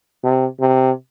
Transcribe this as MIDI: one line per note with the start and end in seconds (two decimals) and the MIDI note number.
0.23 0.46 48
0.60 0.92 48